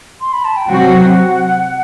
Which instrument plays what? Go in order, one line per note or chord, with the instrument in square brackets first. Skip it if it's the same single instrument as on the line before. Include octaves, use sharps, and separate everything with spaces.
[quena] C6
B5
A5
G5
[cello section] C3 F#3 C4 F#4 [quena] F#5